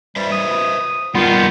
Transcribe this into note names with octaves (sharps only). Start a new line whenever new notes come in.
G3 B4 C5 E5
D#6
D#3 G3 B3 F4